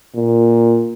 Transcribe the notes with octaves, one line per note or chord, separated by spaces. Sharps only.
A#2